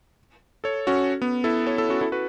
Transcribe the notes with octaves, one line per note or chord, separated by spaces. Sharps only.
A4 C#5
C#4 F#4
B3
E4 A4
A4 C#5
E4 A4
C#4 F#4
E4 A4
F#4 B4